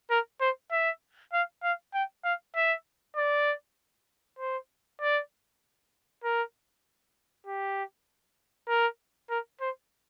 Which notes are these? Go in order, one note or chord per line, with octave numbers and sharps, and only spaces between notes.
A#4
C5
E5
F5
F5
G5
F5
E5
D5
C5
D5
A#4
G4
A#4
A#4
C5